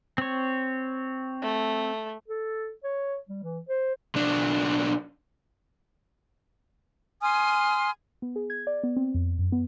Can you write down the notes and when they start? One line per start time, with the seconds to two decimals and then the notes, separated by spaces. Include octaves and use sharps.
0.18 C4 C#5
1.42 A3
2.28 A4
2.83 C#5
3.29 G3
3.43 E3
3.69 C5
4.15 B1 D4
7.21 G#5 C6 D#6 F6
8.22 B3
8.36 G#4
8.50 G#6
8.67 D5
8.84 B3
8.96 C4
9.14 F2
9.39 F#2
9.52 B3